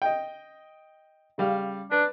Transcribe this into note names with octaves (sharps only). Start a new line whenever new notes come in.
D#5 G5
C#3 G3 F5
D4 B4